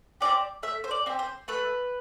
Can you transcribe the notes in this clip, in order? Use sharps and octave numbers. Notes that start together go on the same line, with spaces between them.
C4 E4 G4 D5
A3 E5
C5
D5
C4 E4 G4
C5
A3 B4